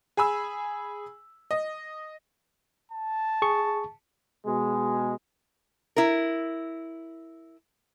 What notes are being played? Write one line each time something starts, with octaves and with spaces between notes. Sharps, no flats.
G#4 G#5 B5 E6
D#5
A5
G#4 C#6
B2 G#3
E4 A#4